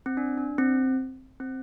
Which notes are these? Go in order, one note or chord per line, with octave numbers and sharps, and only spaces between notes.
C4
D4
D4
C4
C4